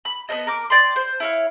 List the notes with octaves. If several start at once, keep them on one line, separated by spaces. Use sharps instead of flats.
B5
B3 A4 C5 D#5
A#4 D6
D5 G5 C6
C5
E4 C#5 F5